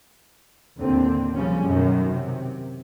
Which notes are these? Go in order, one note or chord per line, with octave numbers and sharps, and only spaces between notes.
D#2 A2 D3 C4
C#3 F3 G3 C#4
F#2 B2 D#3
C3